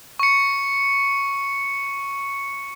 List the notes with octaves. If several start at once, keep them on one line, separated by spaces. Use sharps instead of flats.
C#6 C#7